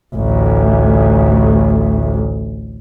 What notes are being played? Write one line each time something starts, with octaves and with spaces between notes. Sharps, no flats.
A1 D2